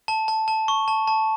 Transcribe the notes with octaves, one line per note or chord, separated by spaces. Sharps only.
A5
A5
A5
C#6
A5
A5